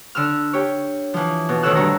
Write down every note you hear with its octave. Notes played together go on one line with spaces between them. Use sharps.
D3 E6 F6
G4 C#5
E3 F3
B2
D2 D#3 A4 C#5 E6 F#6
G2 D3 C#5 A#5